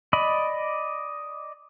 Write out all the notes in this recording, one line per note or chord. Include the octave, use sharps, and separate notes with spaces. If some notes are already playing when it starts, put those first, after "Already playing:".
D5 D#5 B5